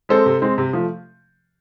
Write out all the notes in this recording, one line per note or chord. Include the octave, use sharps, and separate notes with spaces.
G#3 C4 A4 C5
C3
G#3 C4
C3
F3 A3